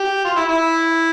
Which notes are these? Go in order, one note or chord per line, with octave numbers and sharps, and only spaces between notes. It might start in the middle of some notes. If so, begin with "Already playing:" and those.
Already playing: G4
F4
E4
E4